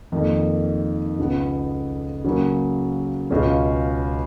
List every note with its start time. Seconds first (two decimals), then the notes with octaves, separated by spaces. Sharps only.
0.12 F2 D#3 A#3
1.18 C#2 C#3 F3 B3
2.24 C#3 F#3 A#3
3.30 C#2 B2 G#3 C#4 F4